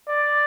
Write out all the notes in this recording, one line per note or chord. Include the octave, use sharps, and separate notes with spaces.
D5